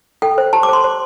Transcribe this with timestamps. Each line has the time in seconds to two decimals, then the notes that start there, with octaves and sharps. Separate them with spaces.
0.22 A4 G5
0.38 C5
0.53 G4 A5
0.63 D6
0.68 C5 C6
0.84 C5